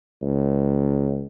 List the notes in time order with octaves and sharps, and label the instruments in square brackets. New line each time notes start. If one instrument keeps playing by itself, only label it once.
[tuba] C#2